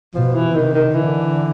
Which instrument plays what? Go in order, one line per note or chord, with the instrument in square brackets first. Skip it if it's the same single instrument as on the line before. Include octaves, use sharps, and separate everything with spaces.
[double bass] B2 [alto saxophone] F3
[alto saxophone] E3
[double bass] C3 [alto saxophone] D#3
[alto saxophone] D#3
[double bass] D3 [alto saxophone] E3